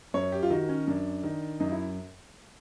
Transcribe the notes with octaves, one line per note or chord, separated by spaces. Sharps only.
F#2 C#5
G4
F4
D#3 F#4
C#4
F#2 D4
D#3
F#2 D#4
E4